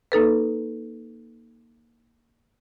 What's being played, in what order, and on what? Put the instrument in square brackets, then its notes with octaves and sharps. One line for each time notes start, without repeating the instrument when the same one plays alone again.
[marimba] A#3 D#4 A4 B4